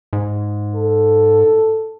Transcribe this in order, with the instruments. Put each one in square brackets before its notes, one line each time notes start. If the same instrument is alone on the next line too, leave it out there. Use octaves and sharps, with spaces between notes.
[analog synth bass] G#2
[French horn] A4